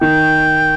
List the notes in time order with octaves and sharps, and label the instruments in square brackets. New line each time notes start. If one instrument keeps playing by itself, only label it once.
[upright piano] D#3 [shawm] G5